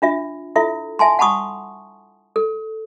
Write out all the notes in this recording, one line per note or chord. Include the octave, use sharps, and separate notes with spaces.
D4 F4 E5
E4 F4 A4 E5
E5 G#5 A5 C6
F#5 A5 B5 C#6 D#6
A4